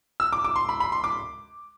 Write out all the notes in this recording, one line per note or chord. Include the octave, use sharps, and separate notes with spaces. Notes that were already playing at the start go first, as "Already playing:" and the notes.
E6
D6
D6
C6
B5
B5
C6
D6